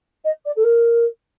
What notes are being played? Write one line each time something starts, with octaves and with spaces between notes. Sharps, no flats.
D#5
D5
A4
A#4